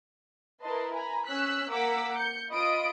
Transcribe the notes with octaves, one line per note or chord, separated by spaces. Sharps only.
E4 A#4 B4 D#5 A5 C6
G#5 A#5 B5
C#4 E6 F#6 B6
A#3 A#4 F#5 D6 E6 B6
G6 C#7
F4 D#5 B5 D#6 D7